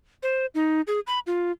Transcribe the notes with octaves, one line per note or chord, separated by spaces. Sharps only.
C5
D#4
G#4
B5
F4